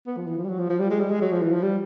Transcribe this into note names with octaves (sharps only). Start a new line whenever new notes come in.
B3
F3
E3
F3
G3
F#3
F3
F3
G3
G#3
G3
G#3
F#3
F3
E3
F3
G3